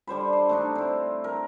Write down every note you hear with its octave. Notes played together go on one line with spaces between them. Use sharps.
D3 G3 C5 B5
C6
A3 D4 D#4
C4 E4
A#4